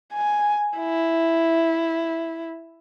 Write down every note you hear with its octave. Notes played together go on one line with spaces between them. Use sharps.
G#5
E4